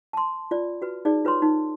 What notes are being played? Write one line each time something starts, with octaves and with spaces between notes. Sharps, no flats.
A5 C6
F4 D5
F#4 B4
D#4 G#4 D5
F4 B4 C#5 C6
D#4